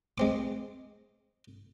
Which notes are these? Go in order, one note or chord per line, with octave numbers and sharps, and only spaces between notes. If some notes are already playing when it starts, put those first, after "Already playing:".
G#3 C4 D6